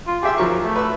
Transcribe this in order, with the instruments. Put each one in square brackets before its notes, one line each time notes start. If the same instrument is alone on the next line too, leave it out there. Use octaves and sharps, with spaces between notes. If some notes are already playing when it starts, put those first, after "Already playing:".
[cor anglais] F4
[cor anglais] G4 [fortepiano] G#4 E5 E6
[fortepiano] F3 F#3 C#6 [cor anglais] A#4
[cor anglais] A3
[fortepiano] B4 E6